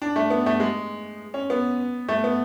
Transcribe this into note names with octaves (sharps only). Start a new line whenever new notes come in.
D4
A3
B3
A3
G#3
C#4
B3
A3
B3